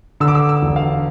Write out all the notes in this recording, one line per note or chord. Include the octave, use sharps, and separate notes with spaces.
D3 E6
D6
E6
E6
E1
F5